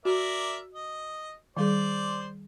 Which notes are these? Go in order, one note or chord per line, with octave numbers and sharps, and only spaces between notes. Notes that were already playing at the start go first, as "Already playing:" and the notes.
F#4 A#4 D5 E5
D#5
D#3 G3 G#4 C5 D5